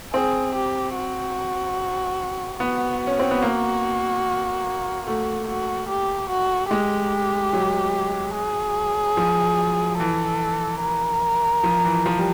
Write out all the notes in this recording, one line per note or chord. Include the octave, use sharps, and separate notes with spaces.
C4 G#4
G4
F#4
B3 F#4
C#4
C4
B3
A#3
A3 F#4
F#4
G4
F#4
G#3 G4
F#3
G#4
F3
E3 A4
A#4
F3
E3
F3
G3